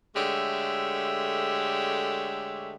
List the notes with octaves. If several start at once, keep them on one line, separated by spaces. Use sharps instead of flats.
D3 G#3 A3 G4 C#5 E5